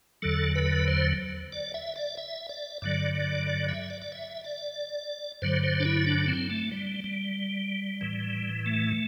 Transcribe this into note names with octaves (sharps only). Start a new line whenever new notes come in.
E2 D3 F#3 A4
B4
C5
D5
E5
D5
E5
D5
G2 D3 F#3 D5
D5
D5
E5
D5
D5
E5
D5
G2 D3 F#3 C5
C5
D4
E4
D4
C4
A3
G3
G3
A2 E3
A3